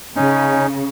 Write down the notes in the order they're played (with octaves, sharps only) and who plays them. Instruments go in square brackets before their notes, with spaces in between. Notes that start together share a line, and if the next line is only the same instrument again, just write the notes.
[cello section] C#3 [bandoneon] C#4 D#4